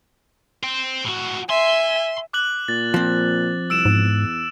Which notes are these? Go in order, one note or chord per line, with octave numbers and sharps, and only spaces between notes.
C5 G5
A2 F#4
E5 G#5 C6
D6 F#6 F#7
A#2 A6
F3 C4
C2 E6 D7 E7
E2 G#2